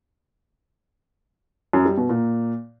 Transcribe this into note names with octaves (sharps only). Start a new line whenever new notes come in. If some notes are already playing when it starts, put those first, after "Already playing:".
F#2
G3
B2
A#2